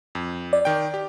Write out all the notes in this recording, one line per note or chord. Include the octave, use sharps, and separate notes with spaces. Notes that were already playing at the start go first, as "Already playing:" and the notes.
F2
D5
D#3 G5
G4